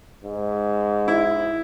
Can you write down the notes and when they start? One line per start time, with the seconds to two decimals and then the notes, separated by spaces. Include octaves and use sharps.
0.24 G#2
1.08 E4